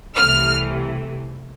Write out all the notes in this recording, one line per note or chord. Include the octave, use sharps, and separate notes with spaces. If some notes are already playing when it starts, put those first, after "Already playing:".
C2 C3 E3 A3 F6